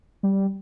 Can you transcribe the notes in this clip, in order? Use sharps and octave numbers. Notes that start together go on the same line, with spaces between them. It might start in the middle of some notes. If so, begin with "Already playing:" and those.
G3